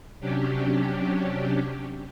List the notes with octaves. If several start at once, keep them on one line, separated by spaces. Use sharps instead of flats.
C3 F#3 C#4 D4 G4